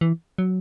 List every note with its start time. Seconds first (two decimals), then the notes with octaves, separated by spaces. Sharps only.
0.01 E3
0.38 F#3